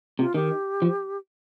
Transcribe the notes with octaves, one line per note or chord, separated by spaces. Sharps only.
C3 F4
D#3 G4
F3